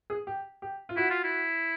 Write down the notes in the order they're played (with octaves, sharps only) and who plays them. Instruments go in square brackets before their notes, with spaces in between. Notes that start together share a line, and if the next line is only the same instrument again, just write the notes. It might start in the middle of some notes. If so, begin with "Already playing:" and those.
[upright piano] G#4
G4
G4
F4
[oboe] E4 [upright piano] F#4
[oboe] F4
E4